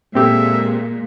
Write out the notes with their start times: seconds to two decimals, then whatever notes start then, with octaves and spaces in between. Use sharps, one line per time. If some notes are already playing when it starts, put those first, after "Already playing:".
0.15 A#2 G#3 C4 G4 A4 E5